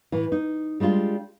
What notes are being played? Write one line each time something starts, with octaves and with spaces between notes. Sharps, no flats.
A2 E3
D#4
G3 G#3 D4 F4